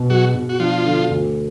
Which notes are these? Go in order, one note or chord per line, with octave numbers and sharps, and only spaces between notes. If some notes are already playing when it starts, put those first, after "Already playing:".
Already playing: B2
F#3 F#4 G#4
B2
F#4
F3 D4 F4
D3
D2